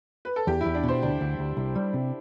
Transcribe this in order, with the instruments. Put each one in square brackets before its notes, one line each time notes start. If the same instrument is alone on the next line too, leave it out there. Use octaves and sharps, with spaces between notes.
[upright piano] B4
A4
[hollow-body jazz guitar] E2 [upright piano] G4
[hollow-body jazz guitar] E2 [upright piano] E4
[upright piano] D4
[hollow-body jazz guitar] B2 [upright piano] C5
[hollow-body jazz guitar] D2 [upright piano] D4
[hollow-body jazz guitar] D2
D2
C2
G3
C3